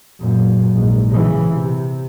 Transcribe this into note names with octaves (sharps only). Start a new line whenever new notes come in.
F#2 A#2
A#1 G#2
C#3 E3
C3